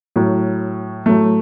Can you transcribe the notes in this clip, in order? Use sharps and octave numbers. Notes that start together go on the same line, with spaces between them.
A2 F#3
A2 F#3 A3